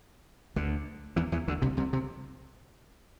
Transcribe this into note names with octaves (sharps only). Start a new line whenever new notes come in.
D2 D3
E2 E3
E2 E3
D2 D3
C2 C3
C2 C3
C3